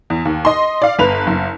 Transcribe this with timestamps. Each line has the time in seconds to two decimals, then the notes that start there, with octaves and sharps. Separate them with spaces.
0.10 E2
0.25 D#2
0.45 D#5 C6
0.82 D5 F5
0.99 G1 B4 F7
1.27 F#1